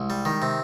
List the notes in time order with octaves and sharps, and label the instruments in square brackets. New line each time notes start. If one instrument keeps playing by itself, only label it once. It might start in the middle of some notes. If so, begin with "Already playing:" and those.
Already playing: [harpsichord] C2 [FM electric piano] G#3
[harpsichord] G3
D#3
C3